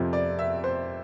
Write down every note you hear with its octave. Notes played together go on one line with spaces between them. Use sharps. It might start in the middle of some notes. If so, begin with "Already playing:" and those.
Already playing: F2 C3 F3
D5
E5
C5